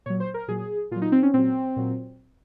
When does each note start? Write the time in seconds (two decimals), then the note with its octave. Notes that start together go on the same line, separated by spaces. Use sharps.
0.06 A#2 F#3 C#5
0.20 C5
0.34 A#4
0.48 A#2 F#3 G#4
0.91 A#2 F4
0.96 F#3
1.02 D#4
1.12 C4
1.23 C#4
1.34 A#2 F#3 C4
1.76 A#2 F#3